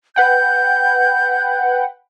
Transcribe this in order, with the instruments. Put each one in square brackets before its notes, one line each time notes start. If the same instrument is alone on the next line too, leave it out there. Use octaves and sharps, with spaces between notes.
[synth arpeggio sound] B4 F#5 G5 [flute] G6